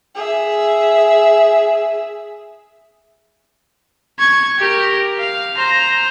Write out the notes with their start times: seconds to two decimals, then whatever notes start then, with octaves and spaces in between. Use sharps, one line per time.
0.15 G#4 E5
4.19 C#6 G#6
4.58 G4 A#4
5.18 F5
5.56 C5 A#5